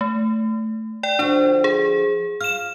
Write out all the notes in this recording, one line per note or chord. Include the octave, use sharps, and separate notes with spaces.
A3
D5 G5
D3 F3 D4 F#4
G#4
F4 F6 E7